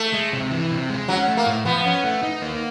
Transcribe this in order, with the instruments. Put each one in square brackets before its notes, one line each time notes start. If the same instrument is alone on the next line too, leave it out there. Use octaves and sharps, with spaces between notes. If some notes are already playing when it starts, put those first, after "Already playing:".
Already playing: [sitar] A3
[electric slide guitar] G#3
C3
E3
C3
G#3
[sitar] F#3 [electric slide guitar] C#4
[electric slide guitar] A3
[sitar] A#3
[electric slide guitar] A2
[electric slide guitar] F3 [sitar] B3
[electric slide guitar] C#4
A3
D#4
A#3